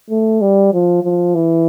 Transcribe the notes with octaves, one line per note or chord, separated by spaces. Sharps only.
A3
G3
F3
F3
E3